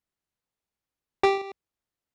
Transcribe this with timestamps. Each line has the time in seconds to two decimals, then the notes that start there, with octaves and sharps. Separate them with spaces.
1.23 G4